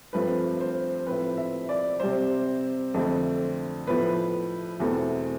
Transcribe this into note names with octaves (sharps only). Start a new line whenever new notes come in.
G2 F3 A3 C4 B4
C5
A2 F3 C4 B4
E5
D5
C3 G3 C4 C5
F2 D3 A3 C4
A2 F3 B3 B4
E2 B2 A3 C4